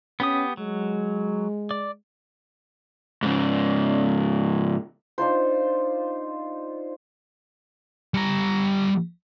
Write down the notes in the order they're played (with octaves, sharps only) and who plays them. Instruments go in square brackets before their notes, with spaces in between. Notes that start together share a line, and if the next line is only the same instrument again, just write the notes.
[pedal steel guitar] B3 G4 D#6 [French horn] C#4
[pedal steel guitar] F#3 [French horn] G#3
[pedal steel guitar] D5
[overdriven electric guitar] G#2 C#3
[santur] D4 D#4 F4 C5
[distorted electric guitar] G3 A#5